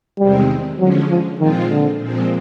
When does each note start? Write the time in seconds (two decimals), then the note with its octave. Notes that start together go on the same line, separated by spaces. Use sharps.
0.19 E2 C3 D#3 G3 G#3 C4
0.79 D3 F3 F#3 G#3 C#4
1.09 F3
1.39 A#2 D#3 F3 G#3 C4 F4
1.69 D3
2.00 A#2 F3 G#3 C4